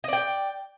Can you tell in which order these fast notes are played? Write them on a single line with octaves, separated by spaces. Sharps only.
D#5 D5 G5